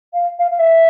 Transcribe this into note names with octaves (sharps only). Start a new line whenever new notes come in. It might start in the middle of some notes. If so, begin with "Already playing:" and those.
F5
F5
F5
E5